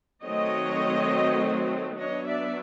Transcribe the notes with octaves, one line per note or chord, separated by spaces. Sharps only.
D#3 F#3 A3 C4 C#5 D#5
F#3 B3 D4 C#5 D#5
D5 E5